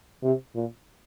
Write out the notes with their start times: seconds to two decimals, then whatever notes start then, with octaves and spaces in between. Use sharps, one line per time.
0.24 C3
0.55 A#2